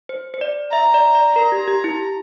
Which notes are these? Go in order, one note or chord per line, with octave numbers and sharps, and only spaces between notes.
C5
C5
D5
E5 A#5
D5
D5
A#4 A#5
G4
G4
E4